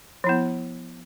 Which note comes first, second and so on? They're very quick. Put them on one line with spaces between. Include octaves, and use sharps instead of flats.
F3 E4 B3